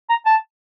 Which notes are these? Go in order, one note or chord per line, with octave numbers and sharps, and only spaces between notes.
A#5
A5